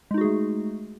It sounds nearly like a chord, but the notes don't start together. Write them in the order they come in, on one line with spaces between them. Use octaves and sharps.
G#3 D#4 F#4 G#4 A3